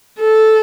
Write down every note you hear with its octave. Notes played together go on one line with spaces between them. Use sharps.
A4